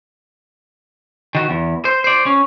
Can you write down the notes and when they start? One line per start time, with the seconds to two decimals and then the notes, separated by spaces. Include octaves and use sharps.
1.35 D#3 F#4
1.50 E2
1.85 C5
2.04 C5 D5
2.26 C#4